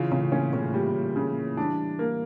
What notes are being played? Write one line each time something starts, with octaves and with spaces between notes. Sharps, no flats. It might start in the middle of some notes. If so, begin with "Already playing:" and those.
Already playing: C#3 E3 F4
A2 C#3
A#2 C#4
A2 C#3
A#2 G3
A2
A#2
C#3
A#2
E3 G3 D4
A#3